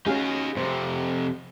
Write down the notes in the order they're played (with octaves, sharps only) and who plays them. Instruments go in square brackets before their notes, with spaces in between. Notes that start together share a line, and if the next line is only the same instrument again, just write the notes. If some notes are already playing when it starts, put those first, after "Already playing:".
[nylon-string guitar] C#4 F#4 G#4 [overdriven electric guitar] D#4 F5
[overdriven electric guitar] F2 C3 [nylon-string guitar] C5